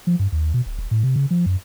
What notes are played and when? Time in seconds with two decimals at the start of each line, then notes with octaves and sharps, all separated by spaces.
0.07 F3
0.19 G2
0.32 D#2
0.54 B2
0.66 D1
0.79 D#1
0.91 A2
1.03 C3
1.16 C#3
1.31 F3
1.46 F#2